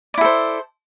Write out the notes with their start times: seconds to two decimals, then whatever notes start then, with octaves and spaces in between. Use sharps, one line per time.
0.14 D5
0.18 E4
0.21 A4
0.25 C5